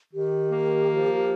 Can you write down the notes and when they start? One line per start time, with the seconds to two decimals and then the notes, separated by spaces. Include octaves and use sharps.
0.14 D#3 G4
0.52 A#3
0.90 F3